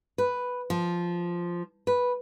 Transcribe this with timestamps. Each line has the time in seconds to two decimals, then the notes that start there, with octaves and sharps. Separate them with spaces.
0.18 B4
0.70 F3
1.87 B4